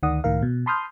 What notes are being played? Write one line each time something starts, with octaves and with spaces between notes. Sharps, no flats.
D2 D#3 D5 F#5 D#6
C#2 A2 D#3 A#4 F5
B2
A5 B5 C6 D#6 F6 G6